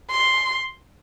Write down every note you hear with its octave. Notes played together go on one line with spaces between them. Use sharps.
C6